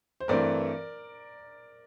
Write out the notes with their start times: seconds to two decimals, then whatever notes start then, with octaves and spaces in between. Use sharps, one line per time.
0.20 C5
0.28 G2 E3 A3 C4 A#4 D5